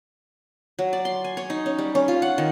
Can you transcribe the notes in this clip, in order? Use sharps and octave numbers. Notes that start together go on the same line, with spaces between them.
F#3
D5
C6
G#5
C#5
D#4
C#4
G3
C#4
F4
F#5
D#3